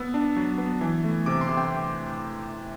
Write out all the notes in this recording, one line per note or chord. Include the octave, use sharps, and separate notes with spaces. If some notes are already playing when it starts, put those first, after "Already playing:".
Already playing: B3 E6
D4
F#3
B3
E3
A3
C3 D6
C6
C3
G5